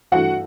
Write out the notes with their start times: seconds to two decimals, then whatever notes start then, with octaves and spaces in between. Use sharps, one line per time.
0.12 G2 E3 A3 F#4 F#5